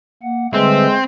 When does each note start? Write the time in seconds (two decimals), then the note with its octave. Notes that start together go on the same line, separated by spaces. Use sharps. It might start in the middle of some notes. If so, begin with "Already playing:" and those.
0.23 A#3 F#5
0.54 D3 G3 G#3 C4 B4 C5 E5